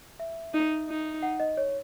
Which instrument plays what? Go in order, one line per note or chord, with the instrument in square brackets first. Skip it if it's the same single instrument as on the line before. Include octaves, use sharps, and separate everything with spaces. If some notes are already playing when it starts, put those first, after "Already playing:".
[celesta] E5
[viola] D#4
D#4
[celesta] F#5
D#5
C#5